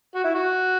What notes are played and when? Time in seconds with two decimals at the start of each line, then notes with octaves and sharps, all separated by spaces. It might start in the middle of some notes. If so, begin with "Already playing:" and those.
0.15 F#4
0.24 E4
0.35 F#4